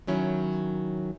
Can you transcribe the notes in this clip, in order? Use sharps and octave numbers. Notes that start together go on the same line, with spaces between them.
D#3 F#3 C#4 E4